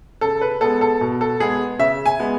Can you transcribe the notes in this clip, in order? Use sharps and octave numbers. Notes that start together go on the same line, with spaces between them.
C#3 A4
B4
G#3 B3 A4
A4
B2
A4
G#3 B3 G#4
C#3 E5
G#5
G#3 B3